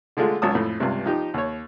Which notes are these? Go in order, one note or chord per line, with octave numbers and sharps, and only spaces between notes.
D3 G#3 A3 F4
G#1 C#2 F#3 C#4 A5 D#6
F2 A2
C#2 G2 C3
F3 D#4 G4
D#2 C#5